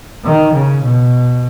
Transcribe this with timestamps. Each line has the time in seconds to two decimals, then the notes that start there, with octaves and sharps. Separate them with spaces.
0.25 D#3
0.54 C#3
0.84 B2